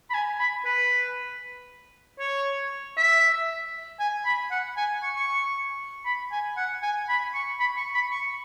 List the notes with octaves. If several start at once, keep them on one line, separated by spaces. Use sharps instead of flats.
B5
G#5
B5
B4
C#5
E5
G#5
B5
F#5
G#5
C#6
C#6
B5
G#5
F#5
G#5
B5
C#6
B5
C#6
B5
C#6